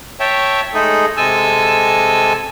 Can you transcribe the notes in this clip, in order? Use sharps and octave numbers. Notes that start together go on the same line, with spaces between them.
C#5 E5 G5 A5
G#3 A3 D#4 G#4 A4
C3 G#3 A4 G#5 A5 E6